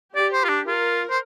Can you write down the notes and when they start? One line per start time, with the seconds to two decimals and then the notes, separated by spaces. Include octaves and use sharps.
0.15 G4 D5
0.32 C5
0.44 F4
0.49 D4
0.66 F4 A#4
1.10 C5